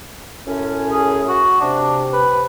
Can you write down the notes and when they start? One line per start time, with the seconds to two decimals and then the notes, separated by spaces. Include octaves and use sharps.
0.46 F#2 A2 C#4
0.91 G#4
1.28 F#4
1.61 C3 D4
2.13 B4